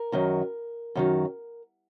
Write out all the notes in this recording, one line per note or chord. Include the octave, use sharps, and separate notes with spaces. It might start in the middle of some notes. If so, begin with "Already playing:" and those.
Already playing: A#4
F#2 D#3 F#3
F#2 D#3 F#3